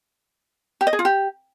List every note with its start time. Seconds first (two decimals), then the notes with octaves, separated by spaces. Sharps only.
0.81 G4
0.87 D#5
0.93 G#4
0.99 F4
1.05 G4